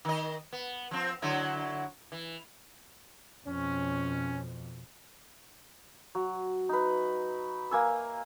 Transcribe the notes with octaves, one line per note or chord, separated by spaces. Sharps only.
D#3 D#5
B3
F3 C4
D3 F#3 E4
E3
F2 B2 C#4
F#3
D#4 B4
A#3 G#5 E6